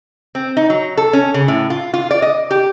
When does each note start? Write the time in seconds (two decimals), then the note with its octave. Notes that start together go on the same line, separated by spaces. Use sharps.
0.35 C4
0.57 D#4
0.70 F#3
0.97 A4
1.13 C#4
1.34 C#3
1.48 A2
1.70 F4
1.94 F4
2.11 D5
2.22 D#5
2.51 G4